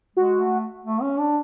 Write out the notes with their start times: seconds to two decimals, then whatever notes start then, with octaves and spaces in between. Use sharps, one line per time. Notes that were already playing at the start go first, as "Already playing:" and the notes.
0.16 G#3 F#4
0.40 A3
0.85 A3
1.02 C#4
1.19 D4